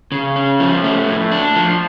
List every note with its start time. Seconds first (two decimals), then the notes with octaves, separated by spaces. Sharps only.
0.12 C#3
0.36 C#4
0.60 F3
0.84 A3
1.07 A2
1.31 D4
1.56 F3